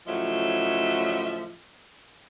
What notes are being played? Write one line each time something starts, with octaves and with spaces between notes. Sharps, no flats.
A2 C#3 F3 F#3 D#5 E5